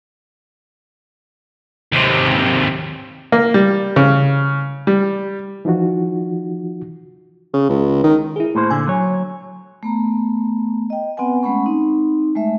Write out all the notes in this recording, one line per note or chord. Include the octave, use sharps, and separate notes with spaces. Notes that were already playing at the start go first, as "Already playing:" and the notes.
D#2 C3
A#3
G3
C#3
G3
E3 F3 D#4 F4 F#4
C#3
C#2
D#3
E4 G#4
A2 A#3 C5
A#2 D3 G#5
F#3 C#5
A3 B3 A#5
D#5 G5
B3 C4 B4 F#5 G#5
G#3 A3 C#4 F#5 B5 C#6
C4 D#4
G#3 A3 E5